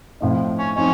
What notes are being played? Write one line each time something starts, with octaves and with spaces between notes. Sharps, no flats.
A2 F3 C4 D#4
C#4
F3 C4 C#4 D#4